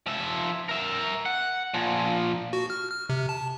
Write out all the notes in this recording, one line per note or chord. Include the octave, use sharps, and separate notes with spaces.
F3 E5
A#4 E5
F#5
A#2 F3
F#4
F6
F6
C3
A5